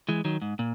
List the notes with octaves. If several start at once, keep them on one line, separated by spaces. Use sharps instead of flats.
E3 G#3
D#3 F#3
G#2
A#2